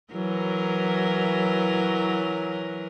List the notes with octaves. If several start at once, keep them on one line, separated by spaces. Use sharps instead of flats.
E3 F#3 A#4